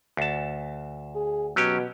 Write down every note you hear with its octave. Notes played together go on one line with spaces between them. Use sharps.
D2 A5
G#4
B2 F#3 C#4 G4